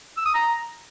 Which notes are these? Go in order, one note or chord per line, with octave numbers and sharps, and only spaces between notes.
E6
D#6
A#5